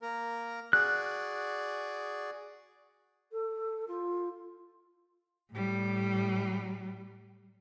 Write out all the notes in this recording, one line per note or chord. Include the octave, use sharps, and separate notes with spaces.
A#3 A#4
F#4 G#4 D5 F#6
A4
F4
A2 G3